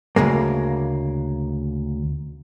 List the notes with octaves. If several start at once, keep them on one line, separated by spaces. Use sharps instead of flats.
D2 C#3 G#3 A#3